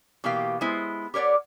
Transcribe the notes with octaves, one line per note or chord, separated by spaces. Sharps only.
B2 E3 A#3 G4 F5
G#3 B3 E4 C5
G4 A#4 C#5 D5 F#5